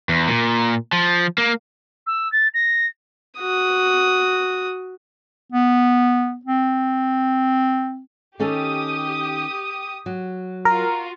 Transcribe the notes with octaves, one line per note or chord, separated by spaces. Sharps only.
E2
A#2
F3
A#3
E6
A6
A#6
F#4 D#6
B3
C4
D#3 C#4 G4 A4 D#6
F#3
F4 F#4 A#4